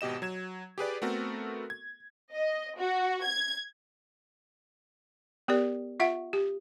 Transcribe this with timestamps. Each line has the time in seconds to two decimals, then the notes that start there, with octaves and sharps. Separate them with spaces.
0.01 G#1 B2 G4 D#5 E7
0.22 F#3 G#6 E7
0.78 G4 G#4 B4 D5
1.02 A3 B3 C4 F#4 A4 A#4
1.70 G#6
2.33 D#5
2.78 F#4
3.24 G#6
5.48 B3 G4 A#4 D5
6.00 F4 E5 F#5
6.33 G4